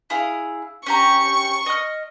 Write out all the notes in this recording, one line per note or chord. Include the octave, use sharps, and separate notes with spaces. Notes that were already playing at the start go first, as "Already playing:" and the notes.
E4 G#4 F5
C#4 G4 A#5 C#6
D#5 F6